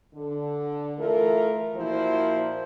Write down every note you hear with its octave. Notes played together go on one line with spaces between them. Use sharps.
D3
E3 A3 F4 A#4
A#2 F3 E4 F#4 A#4 C5